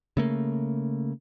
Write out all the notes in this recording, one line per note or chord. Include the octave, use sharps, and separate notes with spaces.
C#3 A3 A#3